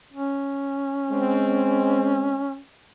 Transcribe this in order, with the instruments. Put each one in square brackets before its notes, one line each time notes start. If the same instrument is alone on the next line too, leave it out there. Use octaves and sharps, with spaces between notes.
[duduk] C#4
[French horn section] G#3 C4